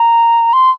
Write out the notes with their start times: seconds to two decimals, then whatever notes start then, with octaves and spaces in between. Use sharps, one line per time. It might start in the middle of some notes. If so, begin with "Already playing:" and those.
Already playing: A#5
0.53 C6